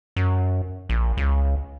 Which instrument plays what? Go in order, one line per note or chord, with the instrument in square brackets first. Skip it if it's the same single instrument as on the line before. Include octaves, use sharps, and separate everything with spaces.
[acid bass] F#2
A#1
C#2